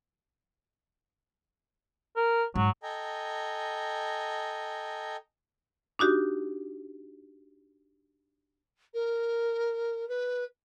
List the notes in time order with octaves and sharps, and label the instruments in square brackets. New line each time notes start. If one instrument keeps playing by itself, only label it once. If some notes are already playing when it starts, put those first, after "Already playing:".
[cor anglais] A#4
[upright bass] G#2 [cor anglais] F#3
[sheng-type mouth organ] A4 D#5 G5 G#5 A#5
[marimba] D4 D#4 F#4 G4
[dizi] A#4
B4